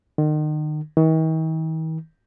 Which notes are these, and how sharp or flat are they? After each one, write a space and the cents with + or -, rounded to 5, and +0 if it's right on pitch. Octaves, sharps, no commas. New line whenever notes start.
D#3 -35
D#3 +45